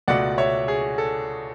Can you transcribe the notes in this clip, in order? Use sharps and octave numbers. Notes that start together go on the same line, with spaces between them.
C#2 B2 A3 D5 F#5
C#5 E5
G#4
A4